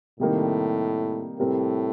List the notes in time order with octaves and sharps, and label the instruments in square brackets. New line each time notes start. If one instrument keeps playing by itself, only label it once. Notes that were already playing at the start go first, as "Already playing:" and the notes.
[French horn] A2 [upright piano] C3 D#3 G3 A#3 D#4
[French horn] A2 [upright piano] C3 G3 C4 G4 A#4